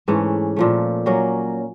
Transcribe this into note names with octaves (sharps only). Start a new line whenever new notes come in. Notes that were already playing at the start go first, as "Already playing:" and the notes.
G#2 E3 A3 C#4
A#2 F3 A3
F#3 A#3 C#4